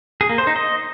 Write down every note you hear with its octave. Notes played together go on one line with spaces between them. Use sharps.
G#4
A#3
C5
D#4
D#5